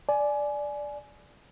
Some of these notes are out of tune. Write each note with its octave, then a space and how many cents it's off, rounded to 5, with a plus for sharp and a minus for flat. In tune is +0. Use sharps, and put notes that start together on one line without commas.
D5 +0 G#5 +20